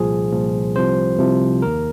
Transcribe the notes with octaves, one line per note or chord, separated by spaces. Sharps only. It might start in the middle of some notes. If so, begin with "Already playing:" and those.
Already playing: C2 A#2 F3 G#4
C2 A#2 F3
C2 C3 F3 C5
C2 C3 F3
D#2 D#3 A#4